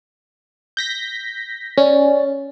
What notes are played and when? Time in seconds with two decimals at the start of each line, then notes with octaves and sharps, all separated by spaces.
0.77 G6 A#6 B6
1.78 C#4 D5